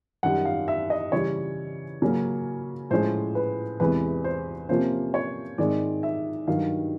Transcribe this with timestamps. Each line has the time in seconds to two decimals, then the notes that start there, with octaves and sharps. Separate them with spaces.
0.23 F#2 D#3 G3 F#5
0.45 F5
0.68 E5
0.90 D#5
1.12 C#3 E3 G3 C#5
2.02 C#3 F#3 A#3 C#4
2.91 A2 F3 G#3 C#4 C5
3.35 B4
3.80 E2 C3 E3 G#3 B4
4.24 C5
4.69 C3 F3 A#3 C#4 F4 C5
5.14 C#5
5.58 G#2 D#3 G#3 C4 D5
6.03 E5
6.47 G2 D#3 F#3 F5